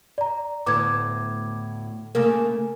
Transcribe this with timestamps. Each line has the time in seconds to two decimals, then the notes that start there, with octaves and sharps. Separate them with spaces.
0.18 D5 A#5
0.66 D2 A2 B3 D6 G#6
2.15 C#3 A3 A#3 A#4